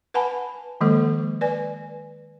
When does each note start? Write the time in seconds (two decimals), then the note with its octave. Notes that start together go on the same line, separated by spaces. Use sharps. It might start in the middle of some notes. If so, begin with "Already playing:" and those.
0.14 B4 F#5 G#5 A5 B5
0.81 D#3 F3 G#3 A#3 A4
1.41 B4 D5 G#5